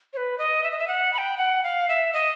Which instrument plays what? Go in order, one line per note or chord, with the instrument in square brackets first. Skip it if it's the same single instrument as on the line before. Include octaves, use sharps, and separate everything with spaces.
[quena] C#5
B4
D#5
E5
D#5
E5
F#5
B5
G5
F#5
F5
E5
D#5